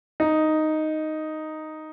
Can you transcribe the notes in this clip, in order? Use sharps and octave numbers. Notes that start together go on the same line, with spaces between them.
D#4